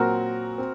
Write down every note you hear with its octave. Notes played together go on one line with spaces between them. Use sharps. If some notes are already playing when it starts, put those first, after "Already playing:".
Already playing: A#2 F#3 C4 F#4 A#4
C4